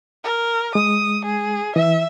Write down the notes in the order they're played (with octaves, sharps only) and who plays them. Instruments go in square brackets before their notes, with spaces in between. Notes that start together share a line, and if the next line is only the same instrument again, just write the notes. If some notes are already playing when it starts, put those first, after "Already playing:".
[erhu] A#4
[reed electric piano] G#3 [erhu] D#6
[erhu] G#4
[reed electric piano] E3 [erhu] E5